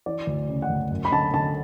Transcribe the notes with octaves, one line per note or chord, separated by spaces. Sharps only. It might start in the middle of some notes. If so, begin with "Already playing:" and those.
E3 D5
D2
C#3
F#5
D2
F#2
B5
D3 A5
D3 A5